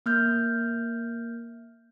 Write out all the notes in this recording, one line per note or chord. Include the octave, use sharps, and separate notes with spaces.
A#3 F6 G6